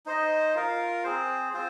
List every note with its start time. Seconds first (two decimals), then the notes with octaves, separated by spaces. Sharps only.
0.06 D#4 C5 D#5
0.55 F4 A#4 F5
1.04 C4 G#4 C5
1.53 C4 F4 C5